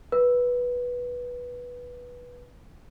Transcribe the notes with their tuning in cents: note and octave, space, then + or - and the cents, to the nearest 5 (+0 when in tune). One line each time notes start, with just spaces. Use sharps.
B4 -10